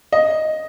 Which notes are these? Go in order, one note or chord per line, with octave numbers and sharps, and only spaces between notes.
D#5